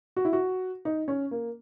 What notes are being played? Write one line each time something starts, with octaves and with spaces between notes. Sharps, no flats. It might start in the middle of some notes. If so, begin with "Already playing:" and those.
F#4
E4
F#4
D#4
C#4
A#3